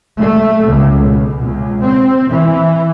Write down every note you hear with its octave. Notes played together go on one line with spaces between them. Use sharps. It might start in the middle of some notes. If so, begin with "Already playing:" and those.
A3
C#2
B2
C#2
C4
E3